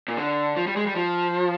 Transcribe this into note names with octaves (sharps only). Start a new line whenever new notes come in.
A#2
D3
F3
G3
G#3
G3
F3